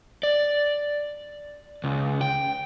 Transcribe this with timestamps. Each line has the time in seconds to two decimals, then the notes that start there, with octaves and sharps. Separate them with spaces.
0.23 D5
1.84 C#2
2.21 G5